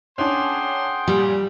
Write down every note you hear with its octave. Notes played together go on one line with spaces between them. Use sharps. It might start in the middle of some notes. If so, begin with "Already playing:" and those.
C#4 D4 G#4 F#5 G5 C6
A#2 G3